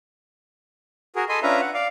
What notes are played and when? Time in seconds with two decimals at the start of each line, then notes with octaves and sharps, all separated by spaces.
1.16 F#4 G#4 A#4
1.29 A4 D#5 G#5 B5 C6
1.43 C#4 D4 F4 B4 E5 A#5
1.61 F#5
1.74 D5 F5